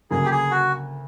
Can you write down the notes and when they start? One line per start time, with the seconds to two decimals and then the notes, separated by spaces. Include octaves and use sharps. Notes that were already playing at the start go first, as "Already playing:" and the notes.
0.11 D2 C#3 F#3 A#3 G#4
0.25 G4
0.31 G#4
0.51 F#4